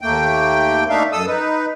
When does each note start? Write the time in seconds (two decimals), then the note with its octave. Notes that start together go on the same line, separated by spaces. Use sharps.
0.01 D#2 A3 A#3 G5
0.89 A3 A#3 D4 D#4 E5 F5
1.12 F#2 A4 D#6 E6
1.27 D#4 B4